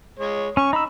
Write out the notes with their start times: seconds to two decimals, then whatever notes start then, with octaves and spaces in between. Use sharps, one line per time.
0.19 G#3 C#5
0.57 C#4 C#6
0.73 D#4 B5 E6